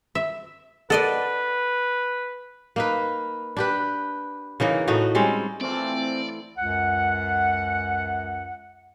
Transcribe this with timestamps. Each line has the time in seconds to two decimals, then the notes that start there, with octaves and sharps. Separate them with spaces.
0.15 E5
0.90 A4 B4 D5 D#5 F#5
2.76 A#3 D#4 B4
3.57 D4 G4 B4
4.60 C#3 E3 A#3 D#4
4.88 A2 A3 D#4 F#4
5.15 G3 G#3 C4 C#4
5.61 E3 A3 C4 F4 D5
6.58 C#2 F#2 F#5